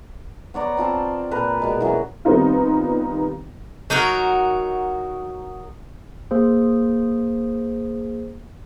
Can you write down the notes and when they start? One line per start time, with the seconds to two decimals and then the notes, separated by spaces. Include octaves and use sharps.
0.54 B3 C#5 D5 A#5
0.77 C4 F4 A5 C6
1.31 A#2 A#4 B4 G#5
1.60 B2 G#3 A#4
1.81 E3 F#3 A#3 C#4
2.25 D#3 G3 B3 C4 D#4 F4
3.90 F#3 D#4 F#4 A#4
6.31 A#3 G#4 C5